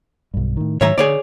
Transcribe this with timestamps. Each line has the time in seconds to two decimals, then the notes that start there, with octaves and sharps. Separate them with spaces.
0.34 B1 G2
0.57 A2 D#3
0.81 G#2 D#3 F#3 C#5 E5 A#5
0.98 D3 G#4 C#5 D5